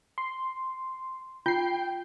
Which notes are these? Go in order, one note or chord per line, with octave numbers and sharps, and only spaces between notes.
C6
F4 G5 G6 C7